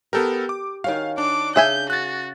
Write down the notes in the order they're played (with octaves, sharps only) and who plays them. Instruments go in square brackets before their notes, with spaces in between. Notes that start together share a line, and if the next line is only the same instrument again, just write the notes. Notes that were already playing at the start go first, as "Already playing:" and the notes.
[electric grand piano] B3 A4 A#4 [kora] G4 G5
[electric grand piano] D6
[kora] D#3 C#4 F#4 [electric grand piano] F5
[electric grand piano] D4 [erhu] D6
[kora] C#3 [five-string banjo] G#4 E5 G#5 [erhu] G6
[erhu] F#4 [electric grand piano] F#6 A6